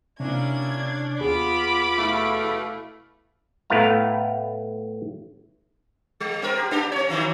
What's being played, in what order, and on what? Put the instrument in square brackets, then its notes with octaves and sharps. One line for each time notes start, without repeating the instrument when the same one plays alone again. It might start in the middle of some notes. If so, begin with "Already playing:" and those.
[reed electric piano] C3 [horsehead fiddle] A#3 E4 [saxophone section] C#4 D4 [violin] G#6
[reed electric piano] D#2 G#4 [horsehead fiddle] B3 F4 [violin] B5 D6
[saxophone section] B2 A3 [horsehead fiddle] E4 F5
[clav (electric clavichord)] A2 A3 B3 E4 F5 A#5
[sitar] G3
B3 A#4
G4
A#3 D4 G4
C4 C#5
D#3 E3 F#3